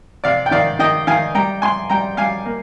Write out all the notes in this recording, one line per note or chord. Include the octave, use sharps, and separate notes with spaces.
C3 D5 F5
G5
D#3 D5 F5
D#3 D#5 G5
D#3 F5 G#5
G3 G5 A#5
G3 G#5 C6
G3 G5 A#5
G3 F5 G#5
A#3